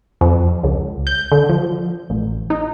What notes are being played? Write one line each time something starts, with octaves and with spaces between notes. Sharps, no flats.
F2
C#2
G6
D3
F3
A1
D#4